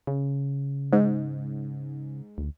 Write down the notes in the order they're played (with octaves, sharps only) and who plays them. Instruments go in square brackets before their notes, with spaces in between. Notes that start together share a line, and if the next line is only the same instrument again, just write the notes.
[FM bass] C#3
[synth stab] G#2
[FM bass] D2